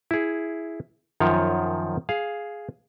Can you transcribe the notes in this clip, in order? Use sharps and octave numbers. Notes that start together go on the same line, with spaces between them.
E4 G#4
F#2 D#3 F3 C#5
G#4 F5